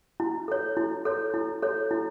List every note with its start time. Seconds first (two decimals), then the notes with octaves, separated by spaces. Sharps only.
0.20 E4
0.48 A4 C#5
0.77 E4
1.05 A4 C#5
1.34 E4
1.62 A4 C#5
1.91 E4